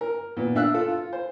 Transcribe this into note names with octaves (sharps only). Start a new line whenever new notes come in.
A#4
A#2 D#3 B3
D4 E5 F5 E6 F#6
F4 A4
F4
C5